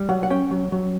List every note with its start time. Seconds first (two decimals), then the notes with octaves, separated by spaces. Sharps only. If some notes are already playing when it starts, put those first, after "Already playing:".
Already playing: G3
0.09 F#3 F#5
0.23 F#5
0.30 C#4 G5
0.51 F#3
0.72 F#3